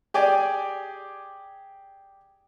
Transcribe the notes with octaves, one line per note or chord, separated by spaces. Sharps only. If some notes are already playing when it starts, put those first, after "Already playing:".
G4 G#4 D5 G#5